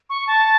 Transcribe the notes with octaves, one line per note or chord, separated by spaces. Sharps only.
C#6
A5